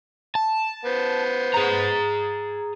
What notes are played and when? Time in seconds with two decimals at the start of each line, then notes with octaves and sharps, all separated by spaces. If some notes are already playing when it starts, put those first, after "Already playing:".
0.35 A5
0.85 B3 C5
1.54 G#4 A#5